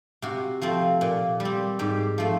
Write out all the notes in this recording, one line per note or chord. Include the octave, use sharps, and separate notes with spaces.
C3 F#4
F3 A3 C4
A#2
G3
C4
G#2 G4
F3 A3 C4